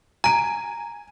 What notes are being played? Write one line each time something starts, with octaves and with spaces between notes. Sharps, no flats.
G#5 A#5 D7